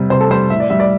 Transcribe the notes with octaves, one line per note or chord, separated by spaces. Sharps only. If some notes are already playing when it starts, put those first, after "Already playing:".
Already playing: C3 G3
C3 C5
A4
G3 C5
A2 E5
D5
G3 E5
D5